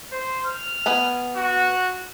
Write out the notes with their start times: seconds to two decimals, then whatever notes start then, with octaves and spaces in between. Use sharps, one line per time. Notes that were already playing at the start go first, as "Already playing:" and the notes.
0.12 C5
0.46 F6
0.86 B3 B4 G#5
1.36 F#4